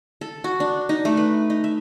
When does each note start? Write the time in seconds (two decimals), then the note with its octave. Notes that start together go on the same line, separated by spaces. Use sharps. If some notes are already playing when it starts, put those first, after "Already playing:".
0.21 A4
0.44 F#4
0.60 D4
0.89 D#4
1.05 A3
1.17 B4
1.50 D#4
1.64 E5